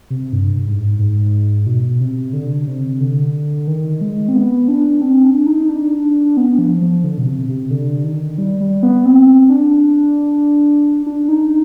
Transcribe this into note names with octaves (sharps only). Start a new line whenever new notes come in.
C3
G2
G#2
G#2
B2
C3
D3
C3
D3
D#3
G#3
C4
B3
D4
C4
D4
D#4
D4
B3
F3
F3
D3
B2
C3
C3
D3
D#3
G3
G3
B3
C4
C4
D4
D4
D#4